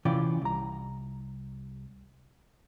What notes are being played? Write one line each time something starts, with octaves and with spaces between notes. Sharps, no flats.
C3 E3 C#4 F4 D5 G5
C2 A#5